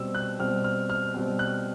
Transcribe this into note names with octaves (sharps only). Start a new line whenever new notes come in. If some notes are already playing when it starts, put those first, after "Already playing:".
Already playing: B2 G3 C4 E6
F#6
B2 G3 C4 F6
F6
F6
B2 G3 C4
F#6